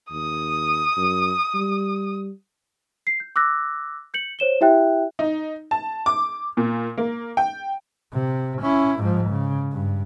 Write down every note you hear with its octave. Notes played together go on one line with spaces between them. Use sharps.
D#2 D#6
F#2
G3
C7
G6
D6 E6 F#6 A#6
G6 C#7 F#7
C5 C#5 E7 G7
E4 G4 E5 G5 F#6
D#4
A5
D6
A#2
A#3
G5
C3
C#4 E4
G#2 F3
C#3
G2